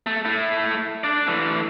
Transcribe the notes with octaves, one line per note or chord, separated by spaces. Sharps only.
A3
A3 E4
D4 D5
E3 A3